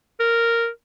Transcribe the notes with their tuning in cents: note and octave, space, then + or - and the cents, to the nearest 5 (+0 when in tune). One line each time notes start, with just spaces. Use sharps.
A#4 -5